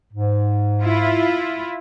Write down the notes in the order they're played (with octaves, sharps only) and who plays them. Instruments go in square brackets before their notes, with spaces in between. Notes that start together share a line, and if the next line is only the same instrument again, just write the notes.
[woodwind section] G#2
[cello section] E4 F4